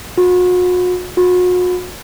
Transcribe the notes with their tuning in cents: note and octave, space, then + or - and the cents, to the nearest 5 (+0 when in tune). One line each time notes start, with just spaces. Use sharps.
F#4 -40
F#4 -40